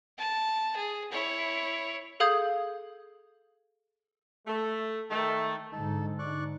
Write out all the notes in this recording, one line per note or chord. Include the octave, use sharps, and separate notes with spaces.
A5
G#4
E4 C#5
G#4 A4 F5 D#6 G6 G#6
A3
D#3 A3
G#2 D3 D#4 A4
D5 C#6 F#6